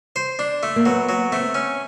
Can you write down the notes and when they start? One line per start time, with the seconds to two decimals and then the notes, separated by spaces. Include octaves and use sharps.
0.16 C5
0.39 D4
0.63 A3
0.76 A#3
0.86 F#3 B3
1.09 F#3
1.32 A3 C4
1.54 C#4